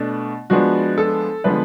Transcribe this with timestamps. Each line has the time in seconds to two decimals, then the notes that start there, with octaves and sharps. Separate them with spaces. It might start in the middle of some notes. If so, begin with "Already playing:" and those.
Already playing: B2 A3 D4
0.50 F3 G#3 B3 D4 F#4
0.98 A4
1.44 D3 F3 G#3 B3 B4